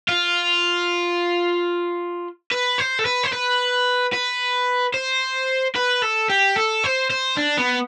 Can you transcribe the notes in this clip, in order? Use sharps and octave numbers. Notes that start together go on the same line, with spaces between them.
F4
B4
C5
A4
B4
C5
B4
B4
C5
B4
A4
G4
A4
C5
C5
D4
B3